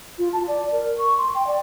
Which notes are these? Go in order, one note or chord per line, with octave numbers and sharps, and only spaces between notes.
F4
A5
D5
A#4
C#6
C6
G5
D5